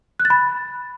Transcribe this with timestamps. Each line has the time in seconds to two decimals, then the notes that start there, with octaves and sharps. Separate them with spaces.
0.20 F#6
0.25 A6
0.30 B5